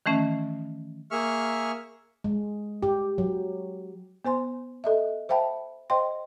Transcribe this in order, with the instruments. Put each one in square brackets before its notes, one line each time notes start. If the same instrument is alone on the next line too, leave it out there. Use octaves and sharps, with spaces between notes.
[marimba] D#3 E3 A3 C#4
[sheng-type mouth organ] A#3 G#4 E5 C#6 F6
[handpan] G#3
G4
F#3
[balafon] B3 C5 G#5 C6
A4 D#5 E5
C5 E5 F5 G5 A5 B5
C5 D#5 F5 G5 C6